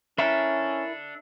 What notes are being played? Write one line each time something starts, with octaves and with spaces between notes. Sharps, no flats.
C#4 D4 E4 A4 A#4 E5